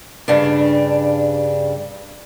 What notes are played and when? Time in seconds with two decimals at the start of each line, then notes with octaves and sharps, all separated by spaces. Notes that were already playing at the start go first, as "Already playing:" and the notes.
0.28 G2 C#3 D4